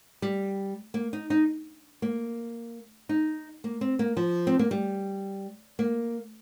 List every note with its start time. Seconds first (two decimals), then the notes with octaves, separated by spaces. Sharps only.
0.22 G3
0.94 A#3
1.13 D#4
1.30 D#4
2.02 A#3
3.09 D#4
3.64 A#3
3.81 C4
3.99 A#3
4.17 F3
4.47 C4
4.59 A#3
4.71 G3
5.79 A#3